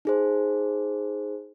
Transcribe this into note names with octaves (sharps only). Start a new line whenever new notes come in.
D#4 G#4 C5